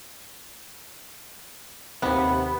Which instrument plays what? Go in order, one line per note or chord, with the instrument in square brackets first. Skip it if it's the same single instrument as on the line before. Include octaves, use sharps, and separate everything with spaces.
[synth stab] D#2 C3 [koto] B3